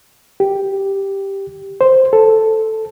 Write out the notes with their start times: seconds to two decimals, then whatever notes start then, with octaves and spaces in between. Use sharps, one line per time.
0.40 G4
1.81 C5
2.13 A4